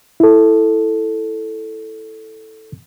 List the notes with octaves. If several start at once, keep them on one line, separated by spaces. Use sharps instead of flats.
E4 A4